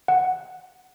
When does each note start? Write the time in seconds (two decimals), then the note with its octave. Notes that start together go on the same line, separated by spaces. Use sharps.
0.08 F#5